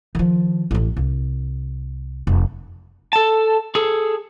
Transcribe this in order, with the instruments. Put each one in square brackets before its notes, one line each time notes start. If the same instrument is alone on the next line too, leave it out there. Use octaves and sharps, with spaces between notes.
[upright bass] D#3 F3
A1 A2
C2
F1
[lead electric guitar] A4 A5
G#4 A4